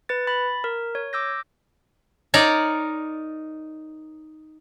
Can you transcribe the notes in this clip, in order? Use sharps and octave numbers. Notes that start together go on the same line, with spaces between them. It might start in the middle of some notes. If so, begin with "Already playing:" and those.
B4 A6
B5 A6
A#4
C#5
D6 E6 G6 A#6
D#4 A#4 C#5 D5